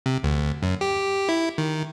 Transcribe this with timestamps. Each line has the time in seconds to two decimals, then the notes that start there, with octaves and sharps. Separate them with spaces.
0.06 C3
0.24 D2
0.63 F#2
0.81 G4
1.29 E4
1.58 D#3